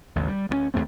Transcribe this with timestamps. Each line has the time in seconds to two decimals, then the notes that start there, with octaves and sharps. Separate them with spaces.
0.16 A1 D#2 C#3
0.28 G3
0.49 D2 G#3 C#4
0.74 D#2 G#2 A3 C4